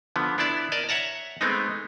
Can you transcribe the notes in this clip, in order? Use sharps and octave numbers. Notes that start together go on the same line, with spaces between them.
D3 F3 B3
B3 D4 E4 D5 A5
A#4 D5 D#5 A5
C#5 E5 F#5 A5 A#5
G#3 A3 B3 C4 D#4